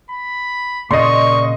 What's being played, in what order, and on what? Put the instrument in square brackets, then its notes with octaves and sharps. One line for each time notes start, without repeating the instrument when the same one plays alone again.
[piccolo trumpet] B5
[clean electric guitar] A#2 C#3 A#3 [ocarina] D5 [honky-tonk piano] D#5 C6 [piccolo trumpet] C#6